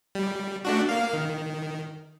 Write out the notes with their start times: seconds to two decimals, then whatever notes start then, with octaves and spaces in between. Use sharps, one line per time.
0.15 G3
0.65 A3 D4 F#4
0.89 A#3 F5
1.13 D#3